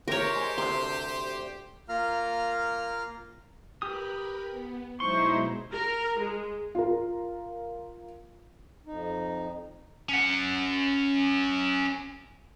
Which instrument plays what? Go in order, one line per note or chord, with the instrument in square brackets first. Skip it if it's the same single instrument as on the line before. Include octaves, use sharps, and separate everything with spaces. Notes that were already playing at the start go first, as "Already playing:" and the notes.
[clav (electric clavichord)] C3 [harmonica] G4 C5 [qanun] A#4 C#5
[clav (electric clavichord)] G#3
[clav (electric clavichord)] D2 C3 [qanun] C6
[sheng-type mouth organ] A#3 F4 F5 A#5 F6
[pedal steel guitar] G4 D#6 [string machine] A#4 B4 B5
[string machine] B3
[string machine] B2 F#3 G#3 [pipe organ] D#4 E4 C5 [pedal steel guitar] C6 [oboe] C#6
[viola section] A#4
G#3
[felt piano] F4 A#4
[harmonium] F2 D#4
[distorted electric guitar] C#4 F#5